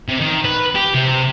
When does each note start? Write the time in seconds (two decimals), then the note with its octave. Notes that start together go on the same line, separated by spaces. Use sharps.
0.09 C3
0.21 D#3
0.45 B4
0.75 G4
0.94 C3